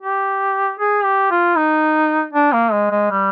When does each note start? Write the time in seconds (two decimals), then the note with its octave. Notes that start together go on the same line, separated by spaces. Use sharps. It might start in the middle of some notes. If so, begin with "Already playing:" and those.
0.02 G4
0.80 G#4
1.04 G4
1.31 F4
1.56 D#4
2.33 D4
2.53 A#3
2.72 G#3
2.91 G#3
3.11 G3